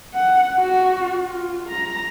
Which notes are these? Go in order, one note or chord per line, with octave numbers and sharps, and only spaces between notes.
F#5
F#4
F4
A#5